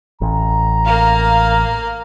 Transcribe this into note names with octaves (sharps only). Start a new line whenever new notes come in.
A1 A#5
A#3 F5